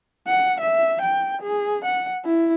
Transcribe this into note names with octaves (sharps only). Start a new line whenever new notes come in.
F#5
E5
G5
G#4
F#5
E4